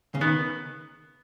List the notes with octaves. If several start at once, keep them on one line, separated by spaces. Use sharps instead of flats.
C#3
D#3 B3